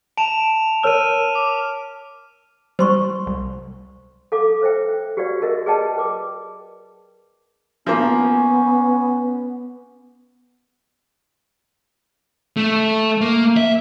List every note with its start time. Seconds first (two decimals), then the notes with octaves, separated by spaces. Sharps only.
0.17 A5 D7 E7 F7
0.83 A#4 C#5 E6 F6 D#7
1.35 D6
2.79 G3 C5 C6 C#6
3.27 C2
4.32 A4 F5 D6
4.61 B4 C5 E5 G5
5.17 F#4 G4 B4 C#5 D5 F5
5.41 F#4 G#4 A#4 D#5 E5
5.66 G#4 B4 D5 D#5 G5 A5
5.97 A#4 B4 D6
7.87 F3 A#3 B3 C#4
12.57 A3
13.21 A#3
13.57 E5